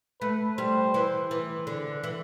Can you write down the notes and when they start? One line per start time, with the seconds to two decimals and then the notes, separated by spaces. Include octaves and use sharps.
0.21 A3 B4
0.58 G3 C5
0.94 E3
1.31 E3
1.67 D3
2.03 E3